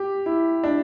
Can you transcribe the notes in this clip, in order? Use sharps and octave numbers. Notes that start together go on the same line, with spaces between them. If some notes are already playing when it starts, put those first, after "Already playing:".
Already playing: G4
E4
D4